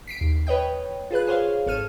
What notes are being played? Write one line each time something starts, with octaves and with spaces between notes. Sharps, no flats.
B6 C7 D7
D#2
B4 C#5 D#5 G5
F4 G#4 B4 F#6
G#4 C5 C#5 F5
G#1 A4 C#5 F6 D#7